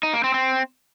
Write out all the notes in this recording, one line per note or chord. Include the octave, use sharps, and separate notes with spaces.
D#4
A#3
C4
C4